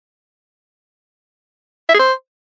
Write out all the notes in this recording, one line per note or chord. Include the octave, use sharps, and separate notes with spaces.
E5
G#4
C5